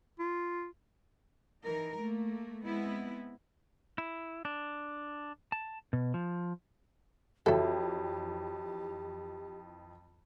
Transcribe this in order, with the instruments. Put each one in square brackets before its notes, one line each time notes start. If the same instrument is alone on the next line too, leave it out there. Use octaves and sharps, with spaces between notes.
[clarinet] F4
[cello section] E3 D#4 A#4
A3 A#3
G#3 B3 C4 E4
[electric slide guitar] E4
D4
A5
B2
F3
[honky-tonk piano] F2 E3 [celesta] F#4 C#5 G5 [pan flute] G4 [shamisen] A4 E5